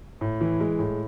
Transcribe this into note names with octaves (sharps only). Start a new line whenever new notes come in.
A2
E3
G#3
A2